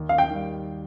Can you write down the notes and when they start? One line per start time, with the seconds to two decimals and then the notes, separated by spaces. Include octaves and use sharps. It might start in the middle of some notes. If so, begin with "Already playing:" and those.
Already playing: D#2
0.09 F5
0.18 G5
0.30 D#3 G3